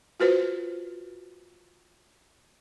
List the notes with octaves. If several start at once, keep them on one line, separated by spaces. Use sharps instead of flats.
F4 F#4 B4 C5